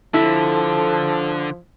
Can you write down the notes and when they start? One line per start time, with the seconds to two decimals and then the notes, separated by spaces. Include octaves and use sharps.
0.14 D3 F3 E4 A4